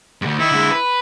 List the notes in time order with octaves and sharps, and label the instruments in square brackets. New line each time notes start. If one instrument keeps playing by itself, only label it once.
[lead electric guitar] D2 G2
[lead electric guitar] D#3 [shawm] E4
[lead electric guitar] D3 G#3
B4